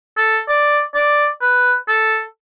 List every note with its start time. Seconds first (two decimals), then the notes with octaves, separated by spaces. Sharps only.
0.18 A4
0.48 D5
0.95 D5
1.41 B4
1.88 A4